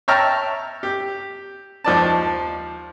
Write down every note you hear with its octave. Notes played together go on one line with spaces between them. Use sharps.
C#5 E5 G5 A5 A#5 F6
G4
D#2 F3 D5 A5